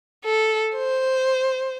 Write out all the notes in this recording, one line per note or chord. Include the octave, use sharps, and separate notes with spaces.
A4
C5